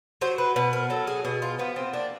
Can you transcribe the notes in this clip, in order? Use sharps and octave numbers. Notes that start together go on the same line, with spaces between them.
F#3 C5
B4
B2 B4
A#4
F#3 A4
G#4
B2 G#4
F4
F3 B3
C4
A#3 D4